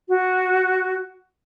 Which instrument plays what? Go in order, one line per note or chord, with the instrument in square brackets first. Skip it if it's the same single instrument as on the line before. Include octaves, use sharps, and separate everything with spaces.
[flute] F#4